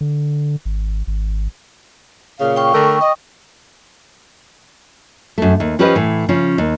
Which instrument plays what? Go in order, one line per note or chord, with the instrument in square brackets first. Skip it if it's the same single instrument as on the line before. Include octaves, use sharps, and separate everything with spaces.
[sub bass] D3
G#1
G#1
[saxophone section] A#2 C#3 F5
[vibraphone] G5 C#6
[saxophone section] D3 A3 A#4
D#5
[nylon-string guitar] F#2 A3
D#2
F3 C#4 G4 B4 C5 D#5
A2 E3
C#3 F3 C#4
D#2